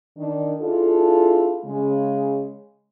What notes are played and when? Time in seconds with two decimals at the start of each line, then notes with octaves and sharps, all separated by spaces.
0.18 D#3 D4
0.59 D4 E4 F4 G#4 A4
1.65 C#3 G#3